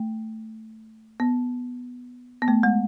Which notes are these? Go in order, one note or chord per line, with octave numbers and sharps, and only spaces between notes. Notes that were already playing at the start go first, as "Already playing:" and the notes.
Already playing: A3
B3
B3
A3
G#3